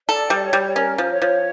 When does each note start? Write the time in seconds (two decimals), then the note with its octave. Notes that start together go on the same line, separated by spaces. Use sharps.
0.08 A4 D5
0.30 G3
0.43 C#5
0.53 G3
0.76 C#4 A#4
0.98 F3 A#4
1.10 C#5
1.22 F3